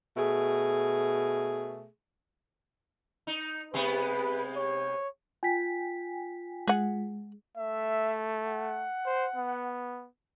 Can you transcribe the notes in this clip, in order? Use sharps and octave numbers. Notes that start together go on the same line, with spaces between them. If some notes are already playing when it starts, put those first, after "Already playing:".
B2 A3 G#4
D#4
C3 G#3 B3 B4
C#5
F4 G5 G#5 B6
G#3 G#4 F#5
A3 E5
F#5
C5
B3